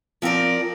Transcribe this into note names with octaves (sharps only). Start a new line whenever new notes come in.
F3 C4 A#4 D5